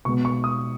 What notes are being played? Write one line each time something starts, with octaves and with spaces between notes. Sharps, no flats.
B2 G#3 B3 C#6
C#6
D#6